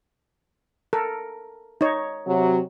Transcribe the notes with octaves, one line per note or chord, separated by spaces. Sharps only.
A4 A#4
D#4 C#5
C3 F#3